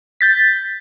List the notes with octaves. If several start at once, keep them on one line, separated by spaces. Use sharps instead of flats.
G6 A6 B6